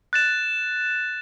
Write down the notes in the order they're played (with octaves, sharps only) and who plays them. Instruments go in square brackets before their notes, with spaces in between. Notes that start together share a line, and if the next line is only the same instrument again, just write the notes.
[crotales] F#6 A6 E7